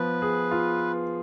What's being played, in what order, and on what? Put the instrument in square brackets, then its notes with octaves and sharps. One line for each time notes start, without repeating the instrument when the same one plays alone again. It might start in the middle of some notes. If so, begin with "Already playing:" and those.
Already playing: [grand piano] F3 B3 F4 [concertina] B4
[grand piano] G#4
F4